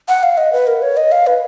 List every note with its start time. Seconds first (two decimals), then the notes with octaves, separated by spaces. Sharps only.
0.08 F#5
0.23 F5
0.38 D#5
0.53 B4
0.67 A#4
0.82 C#5
0.97 D#5
1.12 F5
1.27 B4